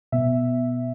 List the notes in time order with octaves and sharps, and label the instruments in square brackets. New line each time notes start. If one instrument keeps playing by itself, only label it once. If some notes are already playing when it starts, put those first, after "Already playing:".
[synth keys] B2 B3 E5